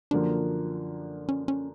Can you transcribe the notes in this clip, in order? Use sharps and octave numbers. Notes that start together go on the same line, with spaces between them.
F#2 D3 F3 A#3 D4
C#4
C#4